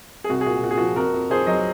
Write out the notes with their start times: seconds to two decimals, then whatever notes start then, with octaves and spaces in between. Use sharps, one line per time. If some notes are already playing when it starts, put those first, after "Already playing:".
0.24 G#4
0.29 C2 F#4
0.41 G#4
0.46 A#2 F#4
0.63 A#2 F#4
0.71 G#4
0.78 F3 F#4
0.96 F2 F#4 A#4
1.14 F2
1.30 F2 G#4 C5
1.47 F#3 C5 D#5